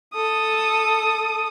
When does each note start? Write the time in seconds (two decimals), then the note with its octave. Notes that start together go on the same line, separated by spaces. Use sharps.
0.15 A4 D#6